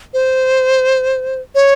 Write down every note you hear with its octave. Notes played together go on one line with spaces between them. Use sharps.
C5
C#5